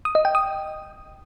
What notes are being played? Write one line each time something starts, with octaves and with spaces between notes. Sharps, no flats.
D#6
D#5
G5
D#6